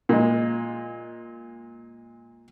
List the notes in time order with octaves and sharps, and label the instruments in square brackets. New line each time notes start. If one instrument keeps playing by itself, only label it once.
[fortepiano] A#2 G#3